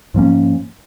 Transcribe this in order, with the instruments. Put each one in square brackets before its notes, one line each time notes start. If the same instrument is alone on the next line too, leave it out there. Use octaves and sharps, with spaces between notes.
[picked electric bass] G#2 F3 A#3 C#4